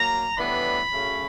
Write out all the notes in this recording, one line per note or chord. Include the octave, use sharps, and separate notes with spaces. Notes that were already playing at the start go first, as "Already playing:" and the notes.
Already playing: F#3 A#3 A#5
A2 E3 G3 B3 D4 B5
F#2 C#3 F#3 A3 C#4